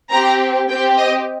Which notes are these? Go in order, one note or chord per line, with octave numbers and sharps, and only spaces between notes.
C4 G4 A#5
C4 G4 G5
D#5